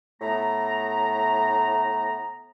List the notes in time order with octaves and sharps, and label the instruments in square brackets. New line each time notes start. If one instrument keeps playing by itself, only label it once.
[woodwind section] A2 A3 B3 A#5